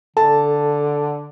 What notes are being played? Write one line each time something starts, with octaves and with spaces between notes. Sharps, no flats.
D3 A4 A5